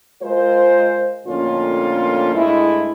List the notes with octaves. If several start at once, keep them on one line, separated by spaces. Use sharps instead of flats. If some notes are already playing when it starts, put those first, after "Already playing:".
G#3 F4 A#4 C5
F2 A2 D3 A#3 C#4 F4
G2 G#3 A3 E4